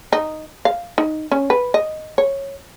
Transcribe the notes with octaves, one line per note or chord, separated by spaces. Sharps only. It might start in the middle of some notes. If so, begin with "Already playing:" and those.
D#4
F5
D#4
C#4
B4
D#5
C#5